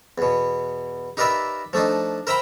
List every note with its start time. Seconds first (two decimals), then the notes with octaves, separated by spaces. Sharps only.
0.18 E2 B2
1.17 D#4 G4 A#4 B4 D5 E5
1.73 F3 A3 D4 D#4
2.27 A#4 C5 E5 G5 A#5 B5